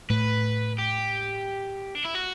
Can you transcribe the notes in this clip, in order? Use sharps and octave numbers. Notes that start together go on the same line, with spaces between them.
A2 A3 B4
G4
D4
E4
F#4